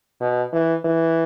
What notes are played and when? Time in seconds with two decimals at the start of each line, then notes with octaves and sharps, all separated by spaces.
0.21 B2
0.53 E3
0.85 E3